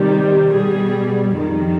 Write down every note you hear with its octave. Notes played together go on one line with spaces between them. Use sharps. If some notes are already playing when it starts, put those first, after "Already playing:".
Already playing: C3 D#3 G3
B2 G3 G#4
F2 D#3 G3